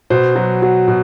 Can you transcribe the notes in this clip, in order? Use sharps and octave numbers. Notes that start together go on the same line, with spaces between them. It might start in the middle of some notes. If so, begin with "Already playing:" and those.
B2 C5
F#3
F#3
B2